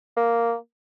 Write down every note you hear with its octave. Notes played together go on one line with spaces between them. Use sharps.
A#3